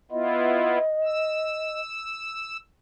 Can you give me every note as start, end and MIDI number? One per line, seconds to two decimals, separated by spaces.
0.11 0.78 59
0.11 0.78 64
0.11 0.78 65
0.11 1.81 75
1.04 2.57 88